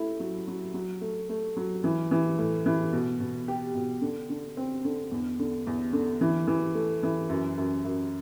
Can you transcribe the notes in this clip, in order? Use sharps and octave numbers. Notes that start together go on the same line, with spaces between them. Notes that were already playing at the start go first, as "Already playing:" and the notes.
Already playing: A3 E4
F#3
F#3
F#3
A3
A3
F#3
E3
E3
A2
E3
B2
B2
G4
B2
D3
D3
C4
D3
E2
D3
E2
D3
E3
E3
A3
E3
F#2
F#2
F#2